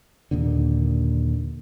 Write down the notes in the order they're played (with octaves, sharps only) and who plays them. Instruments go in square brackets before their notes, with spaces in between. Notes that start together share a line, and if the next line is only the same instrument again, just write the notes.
[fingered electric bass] D#2 A#2 D3